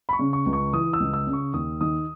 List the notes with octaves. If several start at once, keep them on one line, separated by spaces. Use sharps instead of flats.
B5
C#6
C#3
C#6
C#2
C#6
E3 D#6
E6
C#2
E6
C#3
C#6
D#2 D#6
D#3 D#6